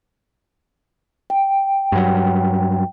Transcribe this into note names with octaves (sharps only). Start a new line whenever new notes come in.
G5
G2 F#3